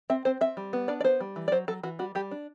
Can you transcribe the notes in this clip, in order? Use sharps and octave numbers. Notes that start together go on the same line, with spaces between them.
C4 E5
C4 C5
C4 E5
G3
B3
D4 D5
D5
B3 C5
G3
E3
D5
F#3 C5
F#3 A4
E3 F#4
G3 F#4
G3 G4
D4